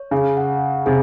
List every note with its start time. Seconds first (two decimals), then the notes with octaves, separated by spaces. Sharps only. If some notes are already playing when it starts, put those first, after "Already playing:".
Already playing: C#5
0.11 C#3 G#4
0.37 F#5
0.62 G#4
0.86 C3 G#4